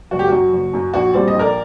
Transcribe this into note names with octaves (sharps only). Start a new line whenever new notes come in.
F#1 F#4
G4
F#2 F#3 F#4
F#1
F#2 F#3
A#1 F#4
A#2 G3 C4 D5
D#5
A#1
A#4 D5